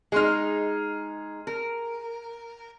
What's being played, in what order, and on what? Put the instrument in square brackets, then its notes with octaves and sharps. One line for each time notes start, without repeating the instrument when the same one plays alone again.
[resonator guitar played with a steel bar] G#3 D#4 [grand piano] G#4 C6 F6
[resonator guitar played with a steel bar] A#4